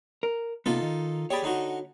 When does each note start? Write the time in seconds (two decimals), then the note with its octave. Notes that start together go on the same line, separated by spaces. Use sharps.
0.23 A#4
0.66 C3 A#3 B3 D#4 F4 A4
0.82 D#3
1.30 G4 G#4 C#5 D5 B5
1.42 D3 D#4 F#4